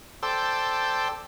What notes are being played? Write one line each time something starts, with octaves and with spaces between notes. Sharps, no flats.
A4 C5 D5 G5 E6